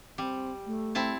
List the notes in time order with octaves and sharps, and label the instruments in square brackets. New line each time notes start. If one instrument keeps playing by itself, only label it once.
[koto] G3 [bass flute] C4
[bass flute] A3
[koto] C4 E4 A5